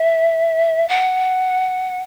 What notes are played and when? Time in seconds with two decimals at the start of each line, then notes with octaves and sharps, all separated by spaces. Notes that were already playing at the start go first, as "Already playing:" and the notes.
Already playing: E5
0.88 F#5